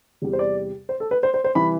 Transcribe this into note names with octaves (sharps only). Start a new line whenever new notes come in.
E2 C3 G3
C5
D5
C5
A4
B4
C5
C5
C5
C3 E3 G3 B5